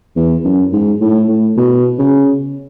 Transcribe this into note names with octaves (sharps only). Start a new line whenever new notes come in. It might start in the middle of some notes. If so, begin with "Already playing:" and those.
E2
F#2
G#2
A2
A2
B2
C#3